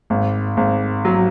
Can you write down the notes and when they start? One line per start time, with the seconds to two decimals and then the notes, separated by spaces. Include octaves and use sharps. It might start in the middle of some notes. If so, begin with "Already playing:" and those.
0.10 G#1
0.57 G#1
1.05 F#3